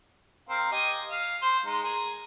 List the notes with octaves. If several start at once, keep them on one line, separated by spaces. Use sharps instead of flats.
C4 A#4 F5
G4 D#5 G#5
F5
C5
G#3 D#4
G#4 A#4